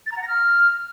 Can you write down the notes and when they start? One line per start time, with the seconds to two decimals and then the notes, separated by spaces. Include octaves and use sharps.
0.06 A6
0.12 A#5
0.17 F#5
0.22 A#6
0.28 F6